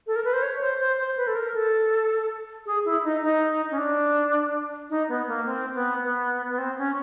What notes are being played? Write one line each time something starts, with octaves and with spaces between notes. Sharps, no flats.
A4
A#4
B4
C5
C#5
C5
C5
C5
B4
A4
A#4
A4
G#4
E4
D#4
D#4
C#4
D4
D#4
B3
A#3
C4
B3
B3
B3
C4
C#4